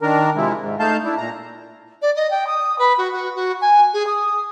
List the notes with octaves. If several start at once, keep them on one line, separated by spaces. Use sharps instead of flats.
D#3 D4 A#4
C3 F3 G#3 E4
G#2
A3 D#4 F5 A5 G6
D4 E4
A#2 A#5
D5
D#5
G5
D#6
B4
F#4
F#4
F#4
G#5
G#4
D#6